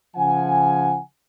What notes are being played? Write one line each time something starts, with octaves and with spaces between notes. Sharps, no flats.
C#3 F3 F#5 G#5